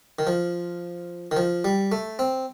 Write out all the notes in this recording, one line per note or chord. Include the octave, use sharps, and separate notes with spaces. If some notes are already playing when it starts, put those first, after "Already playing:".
D#3
F3
D#3
F3
G3
A3
C4